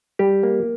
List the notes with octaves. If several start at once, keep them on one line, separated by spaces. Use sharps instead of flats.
G3 G4
A#3